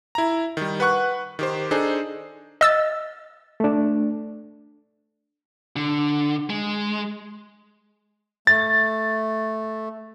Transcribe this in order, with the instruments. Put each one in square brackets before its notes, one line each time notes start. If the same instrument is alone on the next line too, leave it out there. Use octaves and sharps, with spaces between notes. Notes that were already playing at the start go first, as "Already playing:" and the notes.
[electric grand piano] E4 A#5
D#3 G3
B4 F#5 C#6 F#6
D#3 G4 C5
D4 D#4 G#4 A4 C5
[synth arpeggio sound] D#5 E6 A6
[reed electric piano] A3 D4
[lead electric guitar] D3
G#3
[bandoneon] A3 [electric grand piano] A6